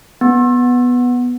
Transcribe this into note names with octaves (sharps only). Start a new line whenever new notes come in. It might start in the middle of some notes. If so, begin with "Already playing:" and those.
B3